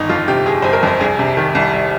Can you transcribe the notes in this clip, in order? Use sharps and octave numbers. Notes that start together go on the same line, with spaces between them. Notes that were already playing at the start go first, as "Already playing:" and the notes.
Already playing: G1 D#3 D#4
F2 F4
C3 G4
G1 G#4
G1 C5
A#4
F2 C5
C2 G#4
C3
D#3
C2
C2